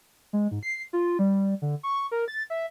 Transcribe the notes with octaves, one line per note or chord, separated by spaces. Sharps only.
G#3
G#2
C7
F4
G3
D3
C#6
A#4
A6
E5